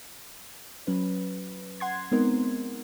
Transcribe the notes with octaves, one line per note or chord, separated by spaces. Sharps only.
F#3 C#4 B4
F#5 C6 G#6
G#3 B3 C4 D#4 A#4